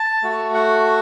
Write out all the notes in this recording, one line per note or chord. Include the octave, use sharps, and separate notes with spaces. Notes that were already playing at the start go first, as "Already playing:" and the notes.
Already playing: A5
A3 F#4
F#5